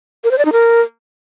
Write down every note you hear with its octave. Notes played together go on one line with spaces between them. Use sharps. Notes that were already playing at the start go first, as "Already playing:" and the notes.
A#4
C5
D5
D#4
A#4